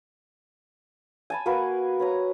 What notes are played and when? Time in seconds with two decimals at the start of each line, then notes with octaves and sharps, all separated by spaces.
1.30 G#5 A5 B5
1.46 A#3 F#4 A#4 B4
1.99 B4 C#5 A#5